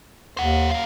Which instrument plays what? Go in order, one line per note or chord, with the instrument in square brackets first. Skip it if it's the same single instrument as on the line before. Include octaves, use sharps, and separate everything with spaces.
[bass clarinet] D#2 [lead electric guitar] C5 F#5
[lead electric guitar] F#2 F5